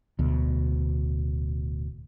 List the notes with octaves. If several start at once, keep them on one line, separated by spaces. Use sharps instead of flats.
D1 D2 B2